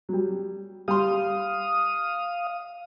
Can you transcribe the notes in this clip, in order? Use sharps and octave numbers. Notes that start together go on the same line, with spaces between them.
F#3 G3
G3 F5 C6 D#6